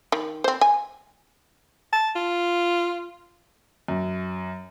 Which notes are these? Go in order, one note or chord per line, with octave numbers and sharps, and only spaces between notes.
D#3
C4 C5
G#5
A5
F4
F#2